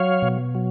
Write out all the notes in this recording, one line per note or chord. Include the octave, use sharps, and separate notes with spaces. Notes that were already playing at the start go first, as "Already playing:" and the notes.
Already playing: F#3 C#5 F5
B2
F#3